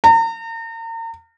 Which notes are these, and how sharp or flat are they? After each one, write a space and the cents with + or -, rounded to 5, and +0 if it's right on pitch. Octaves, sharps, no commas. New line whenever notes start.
A#5 -40